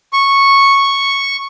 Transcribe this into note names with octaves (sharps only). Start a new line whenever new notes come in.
C#6